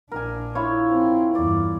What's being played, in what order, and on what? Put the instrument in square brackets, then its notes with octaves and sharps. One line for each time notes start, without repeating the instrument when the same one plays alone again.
[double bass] A#1 D4 [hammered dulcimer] A#4 G#5
[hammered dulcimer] E4 F4 C#5
[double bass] C4
[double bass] E2 G2 [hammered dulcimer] D5